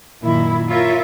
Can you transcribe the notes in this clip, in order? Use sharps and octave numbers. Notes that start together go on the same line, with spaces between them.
F#2 A#2 D#3 E4
E4 F4 A#4 C#5 E5